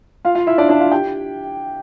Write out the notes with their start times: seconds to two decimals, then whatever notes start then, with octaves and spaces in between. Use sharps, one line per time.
0.25 F4 F5
0.35 F4 F5
0.47 E4 E5
0.58 D4 D5
0.69 D4 D5
0.80 F4 F5
0.92 G4 G5